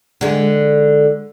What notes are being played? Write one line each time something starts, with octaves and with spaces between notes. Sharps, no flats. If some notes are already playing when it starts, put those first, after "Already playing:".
D3 G#3